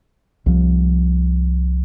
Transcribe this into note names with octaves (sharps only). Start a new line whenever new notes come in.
C2 F3